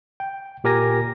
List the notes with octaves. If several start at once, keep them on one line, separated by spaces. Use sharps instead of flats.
G5
A#2 G4 A#4 G#5 A#6